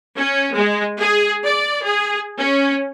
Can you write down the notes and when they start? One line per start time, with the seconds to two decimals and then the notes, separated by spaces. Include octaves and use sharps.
0.17 C#4
0.54 G#3
1.00 G#4
1.45 D5
1.85 G#4
2.39 C#4